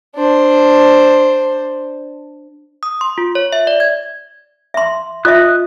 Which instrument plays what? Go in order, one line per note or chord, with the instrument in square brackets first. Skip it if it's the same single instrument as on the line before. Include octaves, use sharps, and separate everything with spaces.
[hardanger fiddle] D4 C5
[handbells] D#6
C6
F4
C#5
E5
D5
G#6
[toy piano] E5 C6
[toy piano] F4 D#5 E5 [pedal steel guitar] D#6 F#6